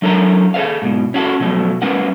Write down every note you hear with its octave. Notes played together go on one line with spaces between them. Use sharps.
F#3 D4 A4 A#4 C#5 A#5
G#4 A4 B4 D#5 F5
G#2 B2
C#4 F4 F#4 G#4 A4
B2 F3 F#3 A3
G3 A3 C#4 A#4 B4 F#5